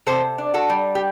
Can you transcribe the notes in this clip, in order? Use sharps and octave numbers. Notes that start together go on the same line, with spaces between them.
C3 A4 C5
D4
F#4 A4
G3
G4